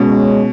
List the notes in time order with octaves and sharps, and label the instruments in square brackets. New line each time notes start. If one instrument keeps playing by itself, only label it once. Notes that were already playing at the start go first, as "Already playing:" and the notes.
Already playing: [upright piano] B2 [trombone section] G#3 C#4